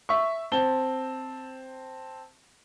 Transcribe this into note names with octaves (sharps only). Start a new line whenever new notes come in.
E5 C#6
C4 A5 G7